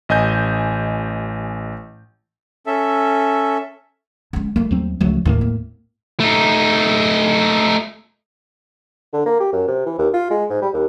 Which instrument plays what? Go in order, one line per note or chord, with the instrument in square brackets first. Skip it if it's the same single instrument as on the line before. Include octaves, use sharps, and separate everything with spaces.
[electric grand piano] A1 D#5 G#5 G6
[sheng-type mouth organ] C#4 A4 E5
[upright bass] G#3 C#4
[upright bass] G3 A3 [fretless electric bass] A#3
[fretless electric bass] D#2 F#3 C4
[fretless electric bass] C#2 F#3 A3 [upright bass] F3
[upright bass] D#2 [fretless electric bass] A2 A3 A#3
[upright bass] C4
[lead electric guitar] A3 D#4
[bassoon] D3
A#3
G4
F#2
C3
E3
D#2
F4
G#3
G#2
G3
D#2